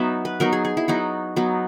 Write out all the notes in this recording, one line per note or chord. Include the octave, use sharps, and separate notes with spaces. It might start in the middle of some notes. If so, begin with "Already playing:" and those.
Already playing: F#3 B3 D#4 E5
B4
F#3 B3 D#4 A#4
G#4
G#4
E4
F#3 B3 D#4 F#4
F#3 B3 D#4